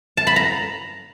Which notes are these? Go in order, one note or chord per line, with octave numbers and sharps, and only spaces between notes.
A5
B5
A#5